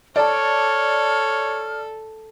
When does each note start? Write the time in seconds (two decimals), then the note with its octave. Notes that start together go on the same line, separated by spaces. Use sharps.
0.16 A4 C#5 D5 A5 F6